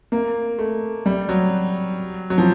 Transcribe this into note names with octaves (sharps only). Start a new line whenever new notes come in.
A#3
A3
G3
F#3
F#3
F3